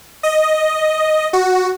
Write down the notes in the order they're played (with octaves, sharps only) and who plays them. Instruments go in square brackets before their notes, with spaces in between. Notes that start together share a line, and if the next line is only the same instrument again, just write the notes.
[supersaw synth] D#5
F#4